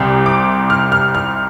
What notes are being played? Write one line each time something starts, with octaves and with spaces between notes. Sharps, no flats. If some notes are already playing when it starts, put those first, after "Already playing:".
Already playing: C2 C3 G3 C4 C6
D6
F6
F6
F6